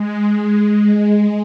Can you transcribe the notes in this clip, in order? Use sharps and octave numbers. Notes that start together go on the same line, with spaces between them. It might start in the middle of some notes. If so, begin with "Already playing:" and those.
Already playing: G#3